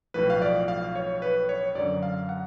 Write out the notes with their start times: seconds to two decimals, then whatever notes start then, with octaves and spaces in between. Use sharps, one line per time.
0.14 B1 A2 F3 B4
0.30 F5
0.42 D5
0.68 F5
0.95 C#5
1.22 B4
1.49 C#5
1.75 F#2 D3 F#3 D5
2.03 F5
2.29 F#5